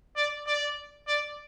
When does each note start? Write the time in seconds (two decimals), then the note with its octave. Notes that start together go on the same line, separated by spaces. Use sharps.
0.17 D5
0.47 D5
1.08 D5